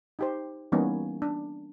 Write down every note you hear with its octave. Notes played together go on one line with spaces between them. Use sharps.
D#4 G4 C5
E3 G3 A#3 B3 C#4 D#4
D4